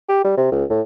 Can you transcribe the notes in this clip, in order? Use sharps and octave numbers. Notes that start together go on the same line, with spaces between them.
G4
G3
C3
C#2
A2